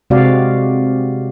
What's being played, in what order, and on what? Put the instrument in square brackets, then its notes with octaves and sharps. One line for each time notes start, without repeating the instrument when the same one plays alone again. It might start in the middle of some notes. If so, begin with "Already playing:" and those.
[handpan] C3 G#3 C4 F#4 D5 F5